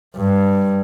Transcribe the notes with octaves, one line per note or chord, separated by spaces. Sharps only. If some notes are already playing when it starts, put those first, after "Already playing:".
G2